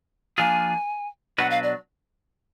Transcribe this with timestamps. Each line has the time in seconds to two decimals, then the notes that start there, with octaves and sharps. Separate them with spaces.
0.38 F3 A#3 D4 F4 G#4 G#5
1.38 B2 F#3 D4 F#4 B4 F#5
1.51 F5
1.63 D5